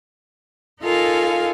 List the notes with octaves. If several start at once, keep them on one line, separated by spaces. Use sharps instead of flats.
D#4 F4 A4 A#4 F5 G#5